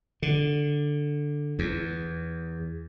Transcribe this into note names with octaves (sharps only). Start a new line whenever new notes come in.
D3
E2